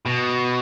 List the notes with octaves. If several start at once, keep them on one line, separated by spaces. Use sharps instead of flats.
B2